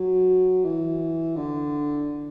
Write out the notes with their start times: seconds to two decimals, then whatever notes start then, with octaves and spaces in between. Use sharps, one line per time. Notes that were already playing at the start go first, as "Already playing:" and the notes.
Already playing: F#3
0.65 E3
1.37 D3